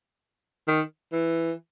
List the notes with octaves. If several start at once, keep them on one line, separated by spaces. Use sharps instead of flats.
D#3
E3